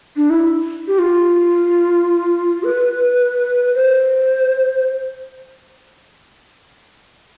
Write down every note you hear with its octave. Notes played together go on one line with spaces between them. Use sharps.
D4
E4
G4
F4
B4
C5